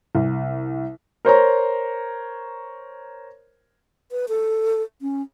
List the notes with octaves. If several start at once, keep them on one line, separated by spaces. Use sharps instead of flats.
C2
A#4 C5 C#5 A#5
B4
A4
C#4